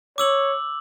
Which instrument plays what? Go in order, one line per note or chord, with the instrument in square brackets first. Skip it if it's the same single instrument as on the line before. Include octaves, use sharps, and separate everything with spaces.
[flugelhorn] C#5 [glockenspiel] D6 E6 F#7